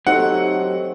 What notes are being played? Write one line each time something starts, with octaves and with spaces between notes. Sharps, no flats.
F#3 A3 C4 D#4 G4 D#5 F#5